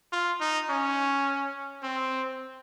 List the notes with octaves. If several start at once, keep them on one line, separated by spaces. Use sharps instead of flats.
F4
D#4
C#4
C4